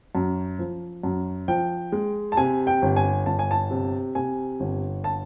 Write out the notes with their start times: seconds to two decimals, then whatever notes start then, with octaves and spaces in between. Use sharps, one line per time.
0.15 F#2
0.59 F3
1.03 F#2
1.48 F3 G5
1.92 G#3
2.32 A5
2.37 C3 G#5
2.67 G5
2.82 G1
2.96 G#5
3.26 G1 A5
3.39 G#5
3.51 A5
3.71 C3
4.15 C3 G#5
4.60 G1
5.04 A5